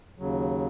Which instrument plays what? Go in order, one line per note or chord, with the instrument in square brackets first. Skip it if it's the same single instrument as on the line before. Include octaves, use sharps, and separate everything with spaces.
[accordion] D#2 C#3 F#3